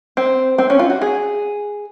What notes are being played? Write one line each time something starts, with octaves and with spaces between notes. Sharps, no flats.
C4
C4
C#4
F4
F#4
G#4